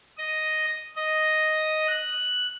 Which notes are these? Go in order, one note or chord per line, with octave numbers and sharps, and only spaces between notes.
D#5
D#5
F#6